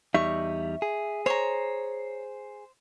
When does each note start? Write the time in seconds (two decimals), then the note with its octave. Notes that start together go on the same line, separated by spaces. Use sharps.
0.14 E2 G3 D#4 E5 C#6
0.82 G#4
1.26 C5 C#5 A#5